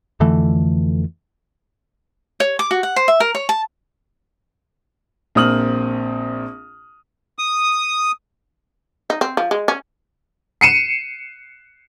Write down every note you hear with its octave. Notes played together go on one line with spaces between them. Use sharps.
F2 D3 E3 A3
C#5
D6
F#4
F#5
C5
E5
A#4
C#5
A5
A#1 A#3 C4 D#6 F6 F#7
D#6
D#4
C4
F3
G#3
C#4
C7 C#7 D#7 E7